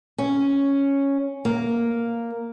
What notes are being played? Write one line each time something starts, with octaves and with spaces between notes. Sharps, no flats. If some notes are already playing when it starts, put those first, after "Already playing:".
C#4
A#3